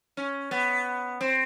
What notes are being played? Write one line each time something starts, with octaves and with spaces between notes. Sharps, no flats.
C#4
B3
C4